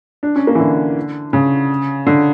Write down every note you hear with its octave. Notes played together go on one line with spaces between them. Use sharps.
D4
C#4
A#3
E3
D3
C#3
D3